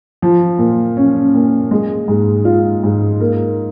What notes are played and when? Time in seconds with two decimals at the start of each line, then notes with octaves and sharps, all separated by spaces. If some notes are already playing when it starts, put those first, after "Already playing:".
0.22 F3
0.59 A#2
0.97 C#4
1.34 A#2
1.71 G#3
2.08 G#2
2.45 F4
2.84 G#2
3.20 A#3